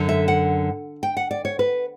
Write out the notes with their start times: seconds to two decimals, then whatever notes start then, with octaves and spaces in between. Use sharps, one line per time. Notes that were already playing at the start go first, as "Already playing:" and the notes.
Already playing: F#2 D3
0.09 E5
0.28 F#5
1.03 G5
1.17 F#5
1.31 D5
1.45 C#5
1.59 B4